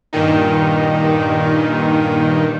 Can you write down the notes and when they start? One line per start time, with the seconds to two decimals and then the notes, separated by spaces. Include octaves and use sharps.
0.13 G2 A#2 D#3 D#4